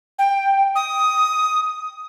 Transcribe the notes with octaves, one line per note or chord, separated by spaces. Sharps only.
G5
D#6